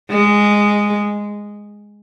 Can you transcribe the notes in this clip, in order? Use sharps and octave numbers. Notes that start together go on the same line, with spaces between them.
G#3